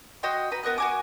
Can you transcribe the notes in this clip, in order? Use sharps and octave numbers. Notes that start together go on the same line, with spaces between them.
F#4 D#5 G5 C6
B4 F#5 A#5
B3 A#4 D#5 F#6
F#4 G#5 D6